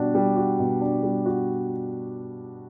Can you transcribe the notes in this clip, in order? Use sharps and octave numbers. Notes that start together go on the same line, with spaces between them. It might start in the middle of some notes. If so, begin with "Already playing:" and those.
Already playing: B2 G3 D4 F#4
G3
F#4
B2
D4
G3
F#4